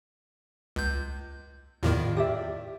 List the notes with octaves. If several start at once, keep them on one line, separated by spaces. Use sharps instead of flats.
C#2 G6
E2 A2 D#3 F4 D5 D#5
G4 D5 E5